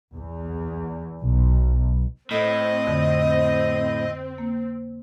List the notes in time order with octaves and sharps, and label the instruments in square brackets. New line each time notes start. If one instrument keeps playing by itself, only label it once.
[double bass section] E2
B1
[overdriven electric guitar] A2 [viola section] C4 [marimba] A4 [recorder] D#5
[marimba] F2 D3
A#3